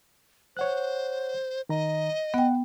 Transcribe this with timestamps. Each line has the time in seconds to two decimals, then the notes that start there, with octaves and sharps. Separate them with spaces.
0.57 C5 C#5 F#5 F#6
1.69 D#3 D#5 A#5
2.34 B3 F#5 G5